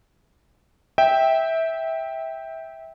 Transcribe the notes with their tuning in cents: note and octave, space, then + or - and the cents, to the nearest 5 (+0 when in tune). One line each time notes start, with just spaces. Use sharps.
E5 -20 G5 +0